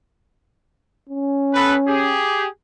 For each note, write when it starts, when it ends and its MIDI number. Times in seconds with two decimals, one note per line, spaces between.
1.09 2.22 61
1.55 1.75 59
1.55 1.75 69
1.55 1.75 71
1.88 2.48 67
1.88 2.48 68